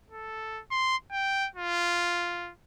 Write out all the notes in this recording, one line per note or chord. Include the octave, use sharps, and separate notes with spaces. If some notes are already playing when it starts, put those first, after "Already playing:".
A4
C6
G5
F4